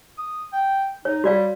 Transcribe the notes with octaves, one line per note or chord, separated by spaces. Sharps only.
D#6
G5
D#4 C#5
G3 F#4 D5 F5